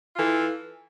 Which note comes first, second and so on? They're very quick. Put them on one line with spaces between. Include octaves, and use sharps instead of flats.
F4 E3 A4